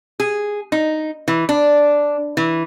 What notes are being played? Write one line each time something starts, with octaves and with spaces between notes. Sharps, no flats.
G#4
D#4
E3
D4
E3